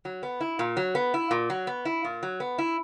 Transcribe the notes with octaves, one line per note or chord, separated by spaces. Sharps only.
F#3
B3
E4
A#2
F#3
B3
E4
A#2
F#3
B3
E4
A#2
F#3
B3
E4